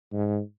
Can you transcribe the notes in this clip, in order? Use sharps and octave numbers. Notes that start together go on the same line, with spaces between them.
G#2